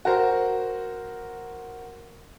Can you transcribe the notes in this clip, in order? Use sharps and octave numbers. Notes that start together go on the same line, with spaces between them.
F#4 A#4 C5